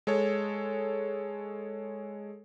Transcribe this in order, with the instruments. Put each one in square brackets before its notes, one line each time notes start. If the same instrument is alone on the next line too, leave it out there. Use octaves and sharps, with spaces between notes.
[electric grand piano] G#3 A4 C#5